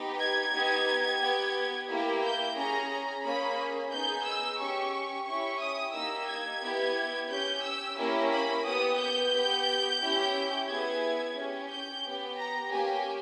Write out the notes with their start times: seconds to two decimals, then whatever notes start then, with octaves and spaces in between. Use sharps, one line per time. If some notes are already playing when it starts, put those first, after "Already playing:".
Already playing: B3 D#4 G4
0.19 G#6
0.53 B3 D#4 G4
1.21 B3 G4
1.88 A#3 E4 G4
2.23 G6
2.55 C#4 G#4 A#5
2.89 A#5
3.24 A#3 C#4 G#4 B5
3.92 B3 D#4 G#4 G6
4.25 E6
4.58 C#4 G4 C#6
5.26 C#4 E4 G4 C#6
5.60 D#6
5.93 A#3 D#4 G4 E6
6.28 G#6
6.61 B3 E4 G4
7.29 C#4 G4 G6
7.64 E6
7.97 A#3 C#4 E4 G4
8.31 B5
8.65 B3 G4 D#6
8.99 G6
9.33 B3 G4
10.00 C#4 E4 G4
10.67 B3 E4 G#4 G#6
11.35 C#4 G4
11.70 G6
12.04 B3 G4
12.37 A#5
12.70 A#3 C#4 G4 G#5